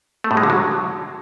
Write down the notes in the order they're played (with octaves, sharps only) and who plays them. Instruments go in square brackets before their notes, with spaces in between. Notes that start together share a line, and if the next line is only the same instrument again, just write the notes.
[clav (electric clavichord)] A3
A2
G#3
D3
F#3